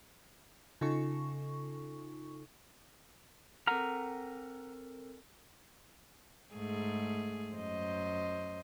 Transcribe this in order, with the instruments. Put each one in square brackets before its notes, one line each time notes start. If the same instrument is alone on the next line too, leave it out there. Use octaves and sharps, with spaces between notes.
[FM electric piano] C#3 D#4 F4 A4 C#6
[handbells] C4 A4 A#4 [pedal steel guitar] F#5 A#5 F6
[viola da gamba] G#2 A3 G#4
F#2 C5 D#5